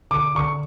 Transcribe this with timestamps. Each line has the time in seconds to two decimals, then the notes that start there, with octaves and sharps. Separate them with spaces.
0.11 D3 D6
0.35 D3 C#6